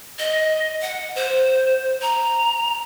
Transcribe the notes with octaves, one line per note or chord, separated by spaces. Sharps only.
D#5
F#5
C5
A#5